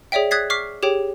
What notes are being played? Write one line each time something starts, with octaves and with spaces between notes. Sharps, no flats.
G#4 C#5 D5 E5 G5
D#6 F#6 G#6 A6 B6 C7
C#6 D6 F6 B6 C7
G4 G#4 C#5 G5